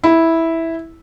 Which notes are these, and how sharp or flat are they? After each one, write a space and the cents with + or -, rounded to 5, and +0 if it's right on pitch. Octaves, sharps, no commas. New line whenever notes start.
E4 -10